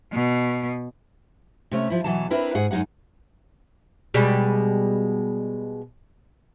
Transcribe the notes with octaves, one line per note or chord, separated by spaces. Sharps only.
B2
C3 A3 C#4
F3 E4
B2 E3 F#3 A5
C4 D4 E4 A#4 B4
G#2 G#4 F#5
F#2 G#3 D#4 G#4 F#5
B2 G3 G#3